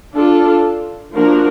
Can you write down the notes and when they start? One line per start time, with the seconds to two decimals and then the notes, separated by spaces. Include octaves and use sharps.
0.14 D4 F4 A4
1.14 F3 A#3 D4 F#4 A#4